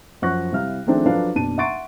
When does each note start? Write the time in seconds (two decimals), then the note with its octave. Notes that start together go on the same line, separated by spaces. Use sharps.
0.22 F#2 F3 F#5 C#6 F#6 A#6
0.52 C3 G3 E4 F5 F6
0.86 D#3 F3 A3 C4 D4 G#4
1.06 F3 F#3 D4 A4 B4 F5
1.35 F#1 B2 D4 A5 D#7
1.58 E5 F#5 C6 C#6 A6 D7